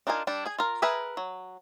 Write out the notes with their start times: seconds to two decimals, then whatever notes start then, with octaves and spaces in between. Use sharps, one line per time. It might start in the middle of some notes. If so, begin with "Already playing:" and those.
0.07 D4 D#4 F4 A#4 G#5
0.27 G3 D4
0.46 G#4 G#5
0.59 F4 A#4
0.82 G#4 A#4 B4 E5 G#5
1.17 F#3